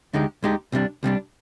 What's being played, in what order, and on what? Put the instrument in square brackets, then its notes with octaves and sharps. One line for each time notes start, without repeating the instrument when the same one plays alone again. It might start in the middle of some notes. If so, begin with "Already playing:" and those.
[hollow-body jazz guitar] D2 D3 G#3 D#4 G4
D2 D3 G#3 D#4 G4
C2 C3 G3 D4
C2 C3 G3 D4